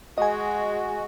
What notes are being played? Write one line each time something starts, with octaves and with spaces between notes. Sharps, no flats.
G#3 F#4 D#5 G#5